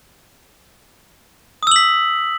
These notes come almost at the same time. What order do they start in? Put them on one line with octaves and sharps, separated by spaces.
D#6 E6 F#7 B6